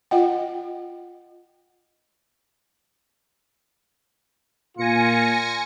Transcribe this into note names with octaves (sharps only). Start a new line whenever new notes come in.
F4 D#5 F#5 G5
A#2 F4 G#5 A#6 C#7